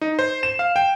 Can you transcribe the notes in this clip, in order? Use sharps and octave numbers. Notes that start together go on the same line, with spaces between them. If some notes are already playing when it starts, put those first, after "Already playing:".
D#4
C5
E7
F5
G5